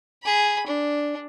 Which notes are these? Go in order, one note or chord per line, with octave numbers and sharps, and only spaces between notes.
G#4 B5
D4